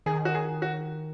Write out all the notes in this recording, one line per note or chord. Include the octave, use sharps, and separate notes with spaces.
D#3 G#4
F#4
G#4
F#4